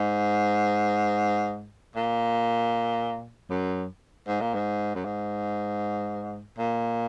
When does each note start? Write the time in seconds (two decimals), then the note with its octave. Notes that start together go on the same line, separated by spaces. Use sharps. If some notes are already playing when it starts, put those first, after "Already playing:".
Already playing: G#2
1.96 A#2
3.50 F#2
4.28 G#2
4.41 A#2
4.54 G#2
4.95 F#2
5.05 G#2
6.58 A#2